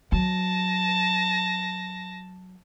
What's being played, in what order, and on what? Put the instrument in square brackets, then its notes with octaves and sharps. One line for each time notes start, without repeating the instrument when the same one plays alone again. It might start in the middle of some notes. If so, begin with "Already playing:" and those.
[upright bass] F#3 [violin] A5 A#6